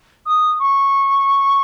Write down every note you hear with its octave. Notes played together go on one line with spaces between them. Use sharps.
D#6
C#6